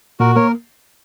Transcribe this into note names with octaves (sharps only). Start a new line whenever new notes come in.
A#2 F#4 A#4
A#3 A#4 C#5